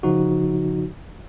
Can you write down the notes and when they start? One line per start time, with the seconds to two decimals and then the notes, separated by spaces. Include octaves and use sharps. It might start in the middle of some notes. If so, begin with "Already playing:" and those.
0.03 C#3 F3 D#4 F#4